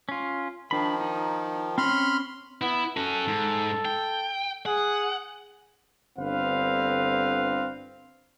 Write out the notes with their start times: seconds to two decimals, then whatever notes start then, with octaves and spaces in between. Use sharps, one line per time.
0.09 C#4 F4
0.71 D#3 F3 D4 B5
1.01 D#4
1.78 C4 C#4 B5 C6 F6
2.61 B3 E4
2.97 C#4 F#4 A4
3.28 G#2
3.85 G5
4.66 G#4 F#5
6.18 G1 D3 C4 B4 F5